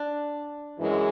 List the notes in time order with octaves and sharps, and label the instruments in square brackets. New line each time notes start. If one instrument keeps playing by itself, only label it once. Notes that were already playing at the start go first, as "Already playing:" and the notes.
Already playing: [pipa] D4
[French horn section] F#2 E3 G#3